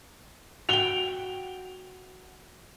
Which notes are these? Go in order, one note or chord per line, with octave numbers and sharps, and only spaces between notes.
F#4 G5 F7 G7